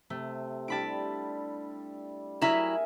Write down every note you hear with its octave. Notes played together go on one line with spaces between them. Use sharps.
C3 A3
G3 D4 E4 A5 B5 D7
F#3 E4 G#4 A#4 E5 G#5 A#5 E7